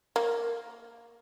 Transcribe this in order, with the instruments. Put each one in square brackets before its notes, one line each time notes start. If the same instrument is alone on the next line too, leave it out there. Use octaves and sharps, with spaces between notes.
[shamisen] A#3